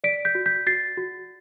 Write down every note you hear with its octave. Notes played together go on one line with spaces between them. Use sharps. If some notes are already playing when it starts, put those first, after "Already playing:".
D5 B6 D7
G6 B6
F#4
G6 B6
F#4 A6 C7
F#4